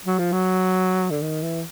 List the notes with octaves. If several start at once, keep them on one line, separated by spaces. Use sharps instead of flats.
F#3
F3
F#3
D3
D#3
E3